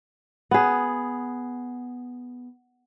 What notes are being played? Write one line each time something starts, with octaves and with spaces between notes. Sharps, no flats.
B3 G#4